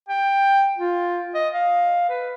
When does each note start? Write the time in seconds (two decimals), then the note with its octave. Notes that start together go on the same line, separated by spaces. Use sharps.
0.09 G5
0.78 F4
1.34 D#5
1.54 F5
2.09 B4